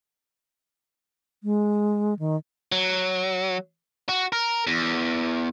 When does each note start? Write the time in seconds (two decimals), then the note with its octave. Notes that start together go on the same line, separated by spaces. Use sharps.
1.43 G#3
2.19 D#3
2.72 F#3
4.09 F#4
4.32 A#4
4.67 E2